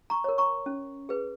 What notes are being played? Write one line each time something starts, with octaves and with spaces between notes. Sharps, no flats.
A#5 C#6
A#4 C#5
A#5 C#6
C#4
G#4 B4